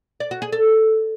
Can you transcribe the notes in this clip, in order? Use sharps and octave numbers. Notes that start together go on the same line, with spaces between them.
D5
F#4
G#4
A4